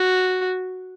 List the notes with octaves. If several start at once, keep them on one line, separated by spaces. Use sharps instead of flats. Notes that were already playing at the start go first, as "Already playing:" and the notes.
Already playing: F#4